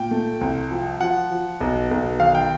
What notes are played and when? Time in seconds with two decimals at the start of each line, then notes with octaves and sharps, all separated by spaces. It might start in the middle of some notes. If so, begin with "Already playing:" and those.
Already playing: A#2 G5
0.11 A3
0.41 C2
0.71 F3
1.01 F3 F#5
1.31 F3
1.61 B1
1.91 B1
2.20 D#3 F5
2.35 G5